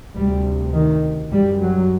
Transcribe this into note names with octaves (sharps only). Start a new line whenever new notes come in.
D2 C3 G3
D#3
F#2 G3
F#3